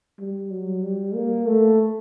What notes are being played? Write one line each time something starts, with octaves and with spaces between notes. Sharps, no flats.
G3
F#3
G3
A#3
A3